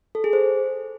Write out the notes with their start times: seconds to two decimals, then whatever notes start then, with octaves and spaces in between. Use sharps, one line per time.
0.15 A4
0.24 G#4
0.33 C5